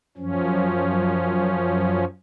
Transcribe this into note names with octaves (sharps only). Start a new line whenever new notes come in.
F#2 F3 C#4